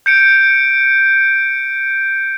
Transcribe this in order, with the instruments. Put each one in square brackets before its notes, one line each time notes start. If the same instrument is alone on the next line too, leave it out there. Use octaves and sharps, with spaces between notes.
[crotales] G6 C#7 D7